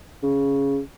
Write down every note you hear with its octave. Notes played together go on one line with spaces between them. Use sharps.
C#3